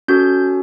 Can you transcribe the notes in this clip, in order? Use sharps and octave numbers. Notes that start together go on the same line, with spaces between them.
C#4 F#4 A4 G6